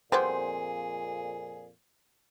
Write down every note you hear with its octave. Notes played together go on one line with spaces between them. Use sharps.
F2 A#2 G3 B3 E4 G#4 C5